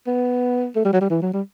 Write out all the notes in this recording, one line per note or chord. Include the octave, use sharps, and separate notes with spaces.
B3
A3
G3
F#3
G3
E3
F#3
G3